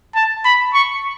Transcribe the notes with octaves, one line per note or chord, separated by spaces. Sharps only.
A5
B5
C#6